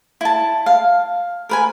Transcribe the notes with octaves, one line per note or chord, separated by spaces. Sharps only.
E4 A5
F5
A#4 B4 G#5